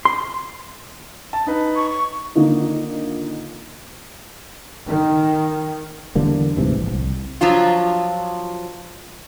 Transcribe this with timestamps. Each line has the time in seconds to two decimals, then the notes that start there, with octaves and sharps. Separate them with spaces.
0.05 C6
1.33 A5
1.47 D#4 B4
1.76 C#6
1.90 C#6
2.35 D3 D#3 A#3 D#4 F4
4.86 D#3
6.15 E2 D3 G3 A#3
6.57 D2 G#2 C3 E3
6.77 A#1
6.92 C2
7.41 F3 F#3 D4 F4